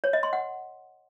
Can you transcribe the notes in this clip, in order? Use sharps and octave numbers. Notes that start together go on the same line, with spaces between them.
C#5
D#5
C6
F#5